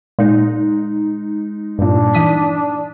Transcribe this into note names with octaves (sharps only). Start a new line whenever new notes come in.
A#2 G#3 D#4
G2 A#2 D4
E3 D#6 B6